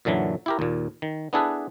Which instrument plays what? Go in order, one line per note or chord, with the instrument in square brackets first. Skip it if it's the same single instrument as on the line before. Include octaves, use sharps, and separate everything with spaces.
[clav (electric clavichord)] F#2 A#2 D3 E3 F#3
E4 G4 A#4
D#2 A#2
D#3
B3 D4 E4 G#4 A4 B4